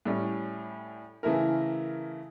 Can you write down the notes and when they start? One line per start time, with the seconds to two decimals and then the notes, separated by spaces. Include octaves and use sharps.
0.05 A2 G3 C#4
1.23 C#3 E3 A3 E4 A#4